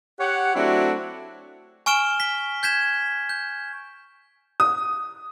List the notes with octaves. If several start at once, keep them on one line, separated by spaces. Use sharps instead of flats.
G4 C#5 F#5
F#3 A3 C4 D4 E4 F#4
G#5 C#6 F6 D7 E7 G7
B6 G7
G6 G#6 B6 E7
G6
D#6